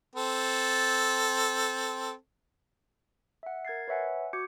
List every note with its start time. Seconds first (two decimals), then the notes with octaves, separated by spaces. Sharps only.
0.16 C4 A4
3.43 E5 F#5
3.65 A#4 G#6 A6 C7
3.88 B4 C#5 E5 F#5 G#5
4.33 F#4 D6 G6 G#6 C#7